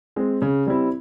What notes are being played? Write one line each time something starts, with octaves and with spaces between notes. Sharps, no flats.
G#3 C4
C#3
G3 C4 E4